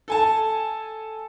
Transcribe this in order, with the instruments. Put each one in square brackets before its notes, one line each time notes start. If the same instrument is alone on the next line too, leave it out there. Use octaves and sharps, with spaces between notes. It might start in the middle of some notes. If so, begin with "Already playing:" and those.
[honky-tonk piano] A4 G#5 A5